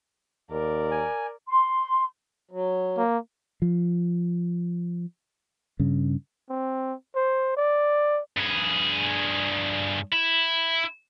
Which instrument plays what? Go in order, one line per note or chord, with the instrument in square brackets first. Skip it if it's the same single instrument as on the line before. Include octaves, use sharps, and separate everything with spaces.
[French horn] D#2 [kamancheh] A#4 D5
[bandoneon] G#5
[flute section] C6
[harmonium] F#3
[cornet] A#3
[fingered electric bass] F3
G2 C#3
[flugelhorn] C4
C5
D5
[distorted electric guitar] G2 G#4
E4